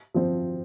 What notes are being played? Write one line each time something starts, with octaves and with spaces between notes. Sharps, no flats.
F3 C4